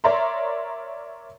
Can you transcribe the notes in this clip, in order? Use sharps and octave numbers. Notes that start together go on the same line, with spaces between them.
A#4 C#5 D5 E5 A#5 C6